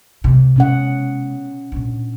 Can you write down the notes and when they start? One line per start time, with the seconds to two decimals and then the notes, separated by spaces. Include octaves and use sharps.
0.24 C3 G#3
0.56 B2 C#4 F#5
1.72 A#2 D4